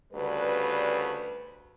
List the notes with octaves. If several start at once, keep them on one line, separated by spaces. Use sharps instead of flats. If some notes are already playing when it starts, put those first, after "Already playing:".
D2 C#3 G3 B4